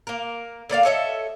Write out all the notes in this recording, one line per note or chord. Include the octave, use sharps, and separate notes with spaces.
A#3 A#4
D3 A#3 D5 F5
A4 C#5 D#5 E5